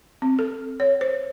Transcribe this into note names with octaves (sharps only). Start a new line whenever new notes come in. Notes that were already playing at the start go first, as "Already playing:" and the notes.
C4
A4
C#5
C5